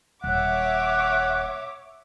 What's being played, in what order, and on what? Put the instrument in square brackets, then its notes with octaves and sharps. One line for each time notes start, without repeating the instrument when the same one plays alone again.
[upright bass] D#1 [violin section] C#5 E5 D6 [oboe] F#5